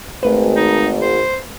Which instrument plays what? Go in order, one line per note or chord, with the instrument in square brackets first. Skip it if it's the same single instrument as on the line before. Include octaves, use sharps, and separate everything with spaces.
[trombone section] G#1 [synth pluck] A3 B4
[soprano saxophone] D#4
C5